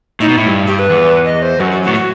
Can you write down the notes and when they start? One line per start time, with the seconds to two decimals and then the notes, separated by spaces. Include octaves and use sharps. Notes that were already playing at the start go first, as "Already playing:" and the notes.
0.20 A2 D#4
0.29 B2
0.38 A2 E4
0.46 G2
0.67 G4
0.79 B4
0.90 E2
1.25 D#5
1.42 C5
1.60 F#2 F#4
1.72 F#4
1.83 F#4
1.86 A2
1.95 F#4